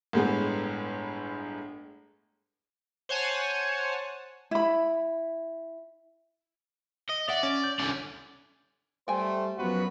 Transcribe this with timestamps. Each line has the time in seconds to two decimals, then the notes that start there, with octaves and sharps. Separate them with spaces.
0.13 G1 A2 G#3 B3
3.09 C5 C#5 F#5 G#5 A5
4.51 E4 B5
7.09 D#5
7.29 D5 E5 F#5
7.43 C#4 A6
7.64 G6
7.79 C2 D3 C#4 D5
9.08 G3 A3 C5 G5 G#5
9.58 F#2 F3 F#3 B3 F#4 B4